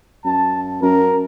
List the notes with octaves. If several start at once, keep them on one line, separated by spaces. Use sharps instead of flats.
F#2 A5
F#2 A#4